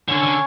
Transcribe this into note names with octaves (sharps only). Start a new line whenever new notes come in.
D3 C#4 C#5
D3